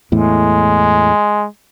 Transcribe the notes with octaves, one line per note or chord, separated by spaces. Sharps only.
E2 A2 G#3